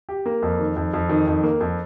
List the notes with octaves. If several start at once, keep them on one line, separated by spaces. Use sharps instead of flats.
G4
A#3
F2
D#3
F2
F2
D#3
F2
A#3
F2